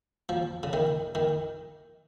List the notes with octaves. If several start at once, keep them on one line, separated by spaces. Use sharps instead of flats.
F3
C#3
D#3
D#3